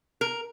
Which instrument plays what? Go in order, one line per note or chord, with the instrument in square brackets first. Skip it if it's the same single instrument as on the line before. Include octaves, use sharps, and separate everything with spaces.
[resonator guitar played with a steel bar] A#4